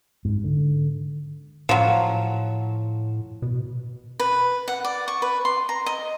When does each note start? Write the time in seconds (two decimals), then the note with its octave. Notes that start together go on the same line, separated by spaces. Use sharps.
0.25 G#2
0.44 D3
1.69 A2 F3 F#3
3.42 B2
4.19 B4
4.68 F#5
4.85 D5
5.08 C#6
5.22 B4
5.45 C6
5.69 A#5
5.86 D#5